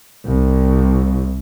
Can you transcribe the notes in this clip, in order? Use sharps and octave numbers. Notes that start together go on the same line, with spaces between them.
C2